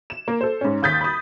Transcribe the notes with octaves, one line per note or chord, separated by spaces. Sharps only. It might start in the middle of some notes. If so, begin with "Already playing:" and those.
E7
A#3
A4 C5
G#2 C#4
D#2 D#6 G6 A6 B6
B5 D#6